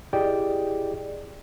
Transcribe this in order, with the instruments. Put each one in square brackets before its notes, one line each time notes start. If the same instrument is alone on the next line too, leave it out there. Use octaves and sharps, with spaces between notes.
[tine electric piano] E4 G4 G#4 D5 D#5 G5